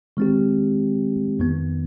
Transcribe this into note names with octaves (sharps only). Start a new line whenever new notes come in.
D#3 G#3 C4 G4
F2 D#3 B3